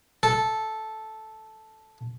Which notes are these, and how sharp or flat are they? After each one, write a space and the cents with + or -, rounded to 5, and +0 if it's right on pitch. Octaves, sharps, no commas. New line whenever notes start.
A4 -5